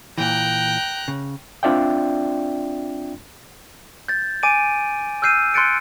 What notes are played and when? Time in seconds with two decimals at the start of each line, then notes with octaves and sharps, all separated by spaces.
0.18 A#2 E3 G5 A#5 F#6
1.08 C#3
1.63 C4 D4 F4 D5 E5 G5
4.08 G6 A6
4.43 G#5 D6 A6 D7 D#7
5.22 E6 F6 G6 C7 D#7
5.54 C6 F#6 G6 A6 C#7 D7